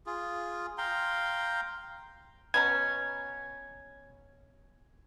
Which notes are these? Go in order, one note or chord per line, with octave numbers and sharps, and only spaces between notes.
F4 G#4
F5 G5 A#5 C6
B2 C#4 A#5 G#6